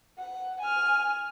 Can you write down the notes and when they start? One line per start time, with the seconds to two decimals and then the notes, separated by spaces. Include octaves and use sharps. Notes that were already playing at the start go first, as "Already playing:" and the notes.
0.18 F#5
0.60 G#5 F6